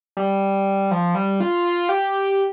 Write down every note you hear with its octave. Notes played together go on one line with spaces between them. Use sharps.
G3
F3
G3
F4
G4